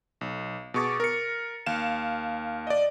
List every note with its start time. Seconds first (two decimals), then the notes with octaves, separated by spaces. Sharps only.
0.21 B1
0.74 B2 G#4 C#6 D6 A6
1.00 A#4 C#7
1.66 D#2 F5 E7
2.67 D5 D#5